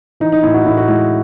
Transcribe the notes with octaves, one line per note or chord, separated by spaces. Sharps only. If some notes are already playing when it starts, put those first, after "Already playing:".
E3 D#4
D#4
A2 E4
F#4
A2 E4
F#4
G#3 E4